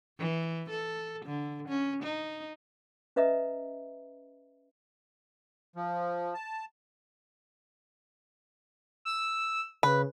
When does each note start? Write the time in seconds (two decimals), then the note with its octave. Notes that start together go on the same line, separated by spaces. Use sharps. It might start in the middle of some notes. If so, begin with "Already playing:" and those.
0.19 E3
0.70 A4
1.26 D3
1.69 C#4
2.03 D#4
3.16 C#4 B4 D#5 E5 A#5 D#6
5.76 F3
6.34 A5
9.05 E6
9.83 C#3 B4